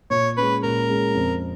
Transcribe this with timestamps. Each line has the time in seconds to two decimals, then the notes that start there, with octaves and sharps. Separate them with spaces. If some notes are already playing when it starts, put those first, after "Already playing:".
0.10 A#2 C#5
0.37 G#3 C#4 B4
0.63 A#2 A#4
0.89 G#3 C#4
1.15 F2